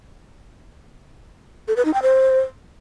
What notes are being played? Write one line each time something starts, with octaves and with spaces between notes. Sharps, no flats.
A4
B4
D#4
G5
C5